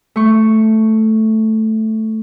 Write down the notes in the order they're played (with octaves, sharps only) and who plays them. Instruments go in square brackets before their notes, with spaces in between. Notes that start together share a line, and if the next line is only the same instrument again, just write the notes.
[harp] A3 C#6